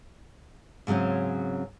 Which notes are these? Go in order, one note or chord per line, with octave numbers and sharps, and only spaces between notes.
G#2 C#3 F#3 C4 C#4